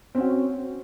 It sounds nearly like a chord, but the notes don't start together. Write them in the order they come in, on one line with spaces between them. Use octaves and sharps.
C4 C#4 F#4